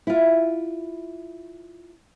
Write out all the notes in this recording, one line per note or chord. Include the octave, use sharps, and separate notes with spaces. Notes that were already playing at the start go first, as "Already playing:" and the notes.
E4 F4